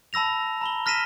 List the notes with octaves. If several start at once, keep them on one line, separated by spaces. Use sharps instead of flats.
A5 B5 E6 A#6 F7
A#5 B5 G7
F6 A#6 B6 D#7 E7